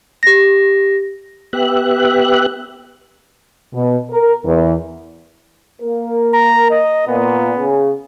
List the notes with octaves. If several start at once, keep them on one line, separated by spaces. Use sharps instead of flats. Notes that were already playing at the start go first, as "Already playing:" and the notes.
G4 A#6
B3 G4 E5 F#6
B2
A#4
E2
A#3 A#4
A#5
D#5
A#2 B3
C#3